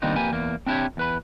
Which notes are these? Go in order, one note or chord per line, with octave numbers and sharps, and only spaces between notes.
D#3 G3 A#3 C4 D4 D#4
F2 A#3 G4 B4 G#5
E2 A#3
C4 D4 E4 F#4 G4 C#5
E2 B4 B5